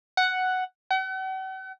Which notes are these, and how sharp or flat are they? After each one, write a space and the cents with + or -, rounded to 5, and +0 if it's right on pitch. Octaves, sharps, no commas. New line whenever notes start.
F#5 +5
F#5 +45